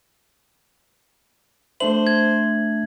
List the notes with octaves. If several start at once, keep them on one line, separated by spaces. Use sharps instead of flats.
A3 D4 C5 E5 F#7
G#6